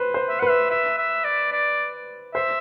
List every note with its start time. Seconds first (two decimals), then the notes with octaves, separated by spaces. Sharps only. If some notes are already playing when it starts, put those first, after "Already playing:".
Already playing: B4 C5
0.14 C5
0.29 E5
0.39 B4 F#5
0.49 E5
0.70 E5
0.98 E5
1.24 D5
1.52 D5
2.35 C5 E5